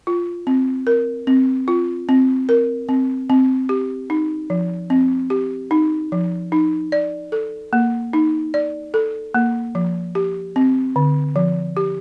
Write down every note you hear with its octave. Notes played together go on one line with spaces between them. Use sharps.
F4
C4
A#4
C4
F4
C4
A#4
C4
C4
G4
D#4
F3
C4
G4
D#4
F3
D#4
D5
A4
A#3
D#4
D5
A4
A#3
F3
G4
C4
D3
F3
G4